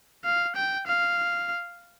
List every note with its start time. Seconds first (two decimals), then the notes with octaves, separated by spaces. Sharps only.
0.24 F5
0.56 G5
0.87 F5